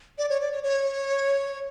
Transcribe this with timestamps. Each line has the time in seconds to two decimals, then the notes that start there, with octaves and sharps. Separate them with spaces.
0.18 D5
0.30 C#5
0.41 D5
0.52 C#5
0.63 C#5